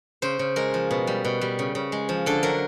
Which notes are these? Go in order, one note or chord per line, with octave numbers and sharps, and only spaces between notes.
C#3 C5
C#3
G#3 A#4
F3
B2
G3
B2
G3
C#3
C#3
G#3
F3
D3 A4
F#3 A#4